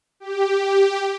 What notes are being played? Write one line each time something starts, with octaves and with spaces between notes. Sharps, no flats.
G4